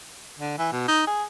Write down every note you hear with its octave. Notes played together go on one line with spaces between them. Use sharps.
D3
E3
B2
D#4
G#4